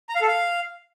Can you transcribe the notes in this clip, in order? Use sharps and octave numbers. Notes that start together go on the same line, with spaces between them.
A#5
F5
A4
F5